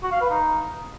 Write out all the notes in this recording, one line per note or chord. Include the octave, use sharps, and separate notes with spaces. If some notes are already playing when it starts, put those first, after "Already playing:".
F#4
F5
B4
D#4